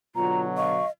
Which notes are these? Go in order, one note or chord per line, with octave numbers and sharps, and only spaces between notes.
B2 D3 F#3 F4 A#5
D#5 F5 C#6